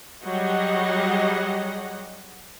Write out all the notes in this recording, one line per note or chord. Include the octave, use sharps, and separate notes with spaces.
F#3 G3 G#4 D#5 F#5